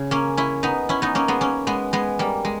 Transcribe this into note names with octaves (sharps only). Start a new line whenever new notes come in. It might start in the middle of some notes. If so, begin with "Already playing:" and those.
Already playing: C#3
A#3 C#4
C#4 E4
B3 D#4
C#4 E4
B3 D#4
A#3 C#4
G#3 B3
A#3 C#4
G#3 B3
G#3 B3
G3 A#3
G#3